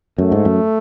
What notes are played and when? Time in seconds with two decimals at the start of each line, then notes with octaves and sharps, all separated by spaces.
0.18 F#2 A3
0.32 G#2
0.45 F#2